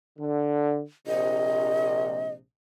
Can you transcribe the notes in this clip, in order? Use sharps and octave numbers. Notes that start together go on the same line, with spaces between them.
D3
A#1 C3 D#5